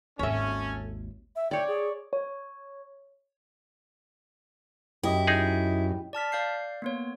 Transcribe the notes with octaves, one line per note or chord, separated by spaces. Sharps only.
G#1 D#2 C#4 A4 C#5 E5
E5
C#5 D5 G5
G#4
C#5
F#2 E4 G4 D#5
D#4 G#4
D5 A5 F6 B6
D5 F5 G6 C7
A#3 B3 C#5